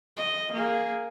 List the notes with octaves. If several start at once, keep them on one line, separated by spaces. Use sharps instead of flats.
D#5
A#3 G#4